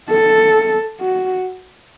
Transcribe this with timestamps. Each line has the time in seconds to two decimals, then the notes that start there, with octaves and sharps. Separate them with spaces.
0.10 A4
1.01 F#4